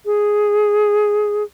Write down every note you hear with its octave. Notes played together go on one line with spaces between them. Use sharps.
G#4